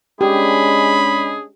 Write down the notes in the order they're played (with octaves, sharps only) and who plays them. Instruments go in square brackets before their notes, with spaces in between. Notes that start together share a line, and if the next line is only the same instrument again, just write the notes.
[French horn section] G#3 C#4 D4 [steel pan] G4 [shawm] G#4 [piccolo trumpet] B5